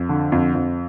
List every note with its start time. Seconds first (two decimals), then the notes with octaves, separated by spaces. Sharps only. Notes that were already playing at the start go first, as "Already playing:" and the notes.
Already playing: F2
0.09 D3
0.32 F2
0.55 F2